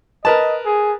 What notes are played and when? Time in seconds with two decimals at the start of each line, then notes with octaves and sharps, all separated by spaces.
0.25 A#4 B4 D#5 A5
0.66 G#4